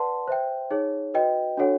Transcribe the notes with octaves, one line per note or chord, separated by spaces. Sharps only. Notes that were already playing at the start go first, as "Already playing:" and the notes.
Already playing: B4 D5 F#5 A5 C6
C5 E5 G5
D#4 G#4 C#5
F#4 B4 D#5 G5
D4 F#4 A4 C#5 F#5